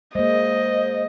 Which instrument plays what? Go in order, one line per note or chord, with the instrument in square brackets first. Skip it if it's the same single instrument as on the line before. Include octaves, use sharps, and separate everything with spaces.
[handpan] G#3 A#3 [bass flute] C5 [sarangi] D#5